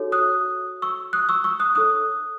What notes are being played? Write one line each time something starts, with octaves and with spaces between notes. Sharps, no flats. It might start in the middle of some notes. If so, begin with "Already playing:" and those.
Already playing: D#4 F#4 A4 C#5
D#6 F#6
C#6 E6
D#6 F#6
C#6 E6
C#6 E6
D#6 F#6
D#4 A4 C#5 D#6 F#6